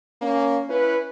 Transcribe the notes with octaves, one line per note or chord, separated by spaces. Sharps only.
A#3 C#4
C#4 E4 B4